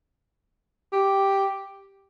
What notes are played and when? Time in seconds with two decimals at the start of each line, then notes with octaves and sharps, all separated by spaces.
0.93 G4